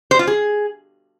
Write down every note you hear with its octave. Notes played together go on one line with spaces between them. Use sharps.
C5
F4
G#4